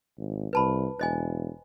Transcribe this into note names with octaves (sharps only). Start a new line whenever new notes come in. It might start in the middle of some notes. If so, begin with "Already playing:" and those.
G#1
C2 B4 A5 B5
E1 C5 D#5 G#5